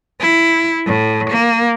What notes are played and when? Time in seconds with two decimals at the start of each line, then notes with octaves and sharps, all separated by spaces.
0.20 E4
0.86 A2
1.30 A#3